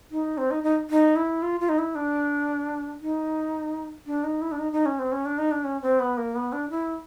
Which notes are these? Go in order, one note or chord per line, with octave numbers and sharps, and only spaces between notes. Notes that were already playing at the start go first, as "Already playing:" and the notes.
D#4
C4
D#4
D#4
D#4
E4
F4
F4
D#4
E4
D4
D#4
D4
D#4
E4
D4
D#4
D#4
C#4
C4
C#4
D4
D#4
D4
C#4
C4
B3
A#3
B3
D4
E4